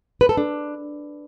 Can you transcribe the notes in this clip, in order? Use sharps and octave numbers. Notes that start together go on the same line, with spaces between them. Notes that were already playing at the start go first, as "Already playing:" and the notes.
B4
A4
D4